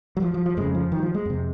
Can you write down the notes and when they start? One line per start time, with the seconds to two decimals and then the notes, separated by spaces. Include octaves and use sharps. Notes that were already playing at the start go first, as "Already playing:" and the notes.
0.17 F#3
0.22 F3
0.34 F3
0.46 F3
0.57 F2 C#3 G#3
0.75 F3
0.92 D#3
0.99 F#3
1.03 F3
1.14 G#3
1.25 F2 C3